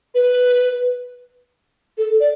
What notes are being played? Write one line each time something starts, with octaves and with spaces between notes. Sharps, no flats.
B4
A4
D5